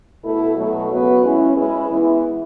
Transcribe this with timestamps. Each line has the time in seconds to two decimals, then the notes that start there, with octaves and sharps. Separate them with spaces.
0.21 B2 A3 E4 A4
0.55 B2 F#3 A3
0.88 C#3 F#3 B3 F#4 B4
1.21 G#3 C#4 E4
1.54 G#3 C#4 E4 G#4 B4
1.87 E3 G#3 B3 E4